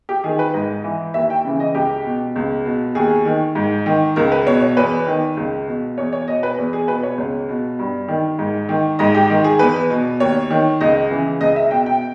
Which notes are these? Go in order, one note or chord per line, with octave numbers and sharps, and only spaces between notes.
G4
D#3 G#4
B4
G#2 D#5
E3
D#2 E5
G5
C#3 E3
D#5
C#2 G4
B2
C#2
B2
D#2 G#4
D#3
G#2
D#3
C#2 A#4
B4
B2 C#5
C#5
E2 B4
D#3
C#2
B2
E2 C#5
C#5
B2 D#5
B4
E2
G#4
B2 B4
C#5
C#2
B2
G2
D#3
G#2
D#3
G#2 D#5
G4
D#3
G#4
E2 B4
B2
D#2 C#5
D#3
C#2 D#5
C#3 E3
C#2 D#5
E5
B2 G5
G5